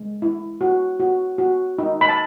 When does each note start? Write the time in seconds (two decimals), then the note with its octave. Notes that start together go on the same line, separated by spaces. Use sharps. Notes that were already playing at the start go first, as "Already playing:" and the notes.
Already playing: G#3
0.22 E4
0.61 F#4
1.00 F#4
1.38 F#4
1.78 D#4
2.01 B5
2.08 A5